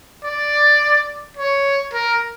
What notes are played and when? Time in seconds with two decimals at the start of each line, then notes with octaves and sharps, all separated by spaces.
0.24 D5
1.37 C#5
1.93 A#4